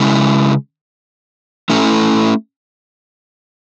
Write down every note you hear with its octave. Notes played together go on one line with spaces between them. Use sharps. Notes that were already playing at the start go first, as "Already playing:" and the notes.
Already playing: C#3 G#3 C#4 E4
A3 C#4 E4 A4